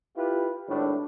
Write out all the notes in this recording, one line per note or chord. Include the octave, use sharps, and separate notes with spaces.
E4 F4 G4 B4
G#1 A2 D4